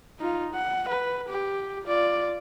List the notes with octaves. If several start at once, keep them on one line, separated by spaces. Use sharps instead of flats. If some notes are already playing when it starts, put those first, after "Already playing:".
D#4 F4
F#5
B4
G4
F4 D5